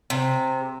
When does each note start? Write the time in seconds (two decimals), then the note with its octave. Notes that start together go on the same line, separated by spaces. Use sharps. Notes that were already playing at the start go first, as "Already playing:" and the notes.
0.10 C3